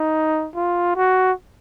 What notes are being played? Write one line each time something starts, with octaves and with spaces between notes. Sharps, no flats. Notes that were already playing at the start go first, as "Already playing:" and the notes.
Already playing: D#4
F4
F#4